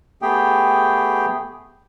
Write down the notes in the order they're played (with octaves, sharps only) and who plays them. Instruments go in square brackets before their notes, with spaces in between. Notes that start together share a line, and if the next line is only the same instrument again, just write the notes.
[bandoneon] A3 B3 G4 G#4 G5